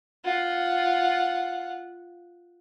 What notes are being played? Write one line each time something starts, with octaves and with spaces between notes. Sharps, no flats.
F4 F#5